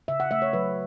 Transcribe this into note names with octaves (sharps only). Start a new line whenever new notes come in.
C#3 E5
F#5
A3 E5
C#5
F#3 B4